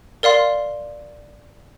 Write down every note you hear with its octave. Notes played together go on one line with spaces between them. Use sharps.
A#4 D5 F5 C6